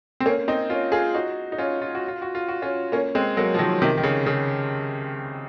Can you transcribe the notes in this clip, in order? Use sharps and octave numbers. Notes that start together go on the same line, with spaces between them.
C4
A#3 C#4
C4 D#4
C#4 F4
F4 G#4
D#4 F#4
D#4
C#4 F4
F4
F#4
F4
F#4
F4
F#4
C#4 F4
A#3 C#4
G#3 C4
F#3 A#3
F3
D#3 F#3
C3 D#3
D#3
C#3
C#3